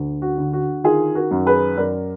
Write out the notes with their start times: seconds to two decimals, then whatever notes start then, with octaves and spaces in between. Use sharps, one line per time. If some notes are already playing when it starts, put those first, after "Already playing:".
Already playing: D2
0.22 F#4
0.38 D3
0.53 F#4
0.84 D#3 F4 G#4
1.15 F#4 A#4
1.31 F#2
1.46 G#4 B4
1.77 F#2 A#4 D5